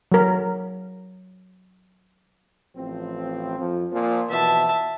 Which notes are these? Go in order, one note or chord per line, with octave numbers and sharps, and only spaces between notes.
F#3 A#4
A1 F3 C4
F2 F3
A#2 F3
B2 E3 F3 E5 A5